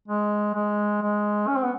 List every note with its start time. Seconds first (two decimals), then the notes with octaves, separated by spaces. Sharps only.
0.08 G#3
0.55 G#3
1.01 G#3
1.47 C#4
1.56 C4
1.63 B3